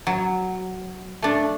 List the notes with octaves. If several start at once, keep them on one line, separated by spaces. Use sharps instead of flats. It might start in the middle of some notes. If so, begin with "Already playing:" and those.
F#3
A3 D4